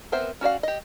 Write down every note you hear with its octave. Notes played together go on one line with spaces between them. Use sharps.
B3 C4 A#4 C5 E5
C#4 F#4 D5 F5
G4 D#5